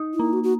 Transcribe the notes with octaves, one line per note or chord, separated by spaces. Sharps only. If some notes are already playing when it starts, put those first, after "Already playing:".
Already playing: D#4
E4
A#3
F#4
F#4